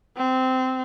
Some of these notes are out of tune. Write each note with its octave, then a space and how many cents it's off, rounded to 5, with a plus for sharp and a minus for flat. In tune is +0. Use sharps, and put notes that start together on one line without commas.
C4 -15